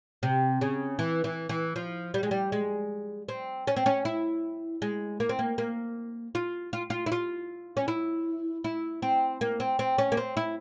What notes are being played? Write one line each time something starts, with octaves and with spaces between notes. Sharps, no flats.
C3
C#3
E3
E3
E3
F3
G3
G#3
G3
G#3
C4
C#4
C4
C#4
E4
G#3
A#3
C4
A#3
A#3
F4
F4
F4
E4
F4
C#4
E4
E4
C4
A#3
C4
C4
C#4
A#3
C4
E4